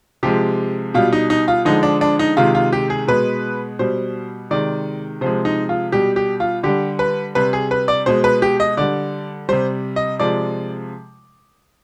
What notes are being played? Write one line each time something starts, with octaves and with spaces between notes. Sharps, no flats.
C3 F3 G#3 G4
B2 G3 F4
D#4
D#4
F4
D3 F3 G#3 D#4
D4
D4
D#4
C3 D#3 G#3 F4
F4
G4
G#4
B2 G#3 B4
B2 G3 C5
C3 D#3 G#3 D5
C3 F3 G#3 C5
D#4
F4
B2 G3 G4
G4
F4
D3 G3 G4
B4
C3 G3 B4
G#4
B4
D5
B2 G#3 C5
B4
G4
D#5
D3 G3 D5
C3 G3 C5
D#5
C3 F3 G#3 D5